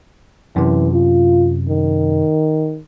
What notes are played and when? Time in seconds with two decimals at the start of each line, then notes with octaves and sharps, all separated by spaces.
0.56 F#2 C3 E3
0.93 F4
1.69 D#3